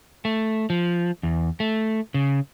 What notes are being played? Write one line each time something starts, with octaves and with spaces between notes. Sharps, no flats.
A3
F3
E2
A3
C#3